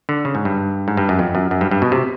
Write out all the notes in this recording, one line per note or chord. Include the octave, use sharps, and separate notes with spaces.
D3
C#3
G#2
G2
G#2
G2
F#2
F2
F#2
F#2
G2
G2
B2
C3